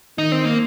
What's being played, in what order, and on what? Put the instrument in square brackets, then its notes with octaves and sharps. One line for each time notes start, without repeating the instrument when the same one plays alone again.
[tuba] D#3 [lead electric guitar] D#4
[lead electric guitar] C4
A#3